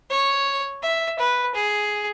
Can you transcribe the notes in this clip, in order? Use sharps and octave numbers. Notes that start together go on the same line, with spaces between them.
C#5
E5
B4
G#4